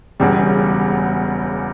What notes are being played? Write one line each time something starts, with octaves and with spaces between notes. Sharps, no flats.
E1 E2 C#3 G3